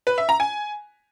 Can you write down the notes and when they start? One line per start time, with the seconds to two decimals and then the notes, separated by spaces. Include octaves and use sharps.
0.07 B4
0.18 E5
0.29 A#5
0.40 G#5